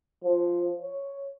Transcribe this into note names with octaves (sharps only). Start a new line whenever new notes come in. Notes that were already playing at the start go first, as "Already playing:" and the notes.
F3
C#5